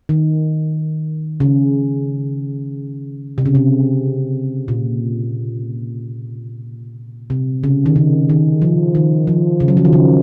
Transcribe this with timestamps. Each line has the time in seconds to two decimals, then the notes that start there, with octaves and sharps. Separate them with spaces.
0.09 D#3
1.40 C#3
3.38 C3
3.46 C#3
3.55 C3
4.68 A#2
7.30 C3
7.63 C#3
7.86 D#3
7.96 C#3
8.30 D#3
8.62 F3
8.95 D#3
9.27 F3
9.60 C#3
9.68 F#3
9.77 F3
9.85 D#3
9.93 C#3